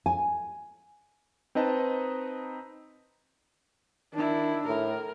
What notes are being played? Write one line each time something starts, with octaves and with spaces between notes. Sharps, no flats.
G#5
C4 D#4 B4 D#5 A5
D#3 D4 E4
A2 A#4